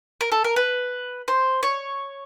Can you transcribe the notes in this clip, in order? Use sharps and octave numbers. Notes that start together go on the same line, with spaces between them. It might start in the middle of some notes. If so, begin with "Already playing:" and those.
A#4
A4
A#4
B4
C5
C#5